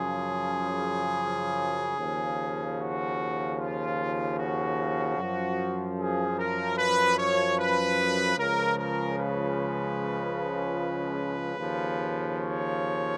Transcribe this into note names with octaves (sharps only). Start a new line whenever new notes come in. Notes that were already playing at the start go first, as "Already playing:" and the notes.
Already playing: F#2 C#3 F3 G#4
D#2 C#3 F3
F#4
F4
F#4
F#2 F3
G#4
A#4
B4
C#5
B4
C#2 C#3 F3 A#4
A#4
B4
D#2 C#3 F3
C#5